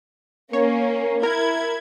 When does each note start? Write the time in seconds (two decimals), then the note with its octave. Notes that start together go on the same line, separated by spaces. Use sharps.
0.53 A#3 C#4 C#5
1.23 E4 A#4 G#6